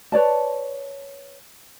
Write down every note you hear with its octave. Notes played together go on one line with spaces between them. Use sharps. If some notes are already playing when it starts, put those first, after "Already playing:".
B4 C#5 D5 A5